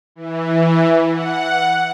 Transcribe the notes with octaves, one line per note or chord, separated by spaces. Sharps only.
E3
F#5